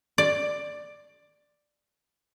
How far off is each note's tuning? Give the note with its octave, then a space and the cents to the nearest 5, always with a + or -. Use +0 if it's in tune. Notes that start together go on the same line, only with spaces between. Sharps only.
D5 +10